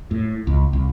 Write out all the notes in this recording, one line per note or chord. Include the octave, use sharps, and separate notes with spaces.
A2
C#2
C2